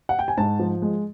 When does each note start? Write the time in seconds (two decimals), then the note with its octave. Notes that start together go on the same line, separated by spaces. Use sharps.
0.09 F#5
0.19 G5
0.28 G#5
0.37 G#2 A5
0.60 F3
0.82 G#3